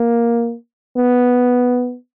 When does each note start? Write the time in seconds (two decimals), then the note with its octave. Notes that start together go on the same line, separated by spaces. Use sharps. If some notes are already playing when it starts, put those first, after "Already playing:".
Already playing: A#3
0.97 B3